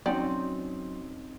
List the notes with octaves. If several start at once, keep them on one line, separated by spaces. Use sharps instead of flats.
F#3 C4 C#4 D#4 D5 G5